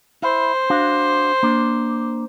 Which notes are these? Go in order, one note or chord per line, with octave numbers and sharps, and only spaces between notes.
E4 C5
D4 F#4 F5
A#3 D4